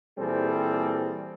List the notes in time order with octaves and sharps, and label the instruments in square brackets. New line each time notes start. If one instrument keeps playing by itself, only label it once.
[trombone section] A#2 E3 G3 C4 G#4 A4